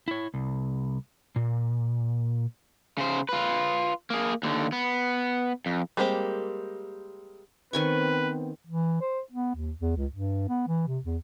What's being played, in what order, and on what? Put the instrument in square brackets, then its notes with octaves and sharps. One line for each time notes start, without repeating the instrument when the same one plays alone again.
[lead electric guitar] E4 C#5
C2
A#2
[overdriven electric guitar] C#3 C5
F4 B4
A#3 G#4
D#2 D3
B3
F2
[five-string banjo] G3 G#3 A#3 C4 G4
[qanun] D#3 G#5 C#6 [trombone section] B3 C4 [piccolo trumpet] B4
[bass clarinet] E3
C5
B3
D#2
E2
C#2
G2
B3
E3
C3
E2